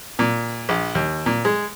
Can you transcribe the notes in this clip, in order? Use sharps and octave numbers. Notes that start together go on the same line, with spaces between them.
A#2
A#1
D#2
A#2
G#3